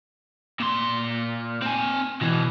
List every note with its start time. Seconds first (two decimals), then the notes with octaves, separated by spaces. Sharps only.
0.60 A#2 C6
1.62 C4 G#5
2.21 B2 E3